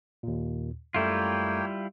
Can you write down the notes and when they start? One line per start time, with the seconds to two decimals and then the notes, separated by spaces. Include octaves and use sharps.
0.23 D#2 A#2
0.94 F#2 G3 A3 A#3 E4 F4 C#5 G5